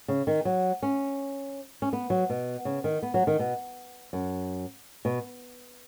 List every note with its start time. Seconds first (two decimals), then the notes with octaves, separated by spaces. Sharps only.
0.08 C#3
0.27 D#3
0.45 F#3
0.83 C#4
1.82 C#4
1.93 B3
2.10 F#3
2.30 B2
2.65 C#3
2.84 D#3
3.02 B3
3.14 F#3
3.27 D#3
3.39 B2
4.13 F#2
5.05 B2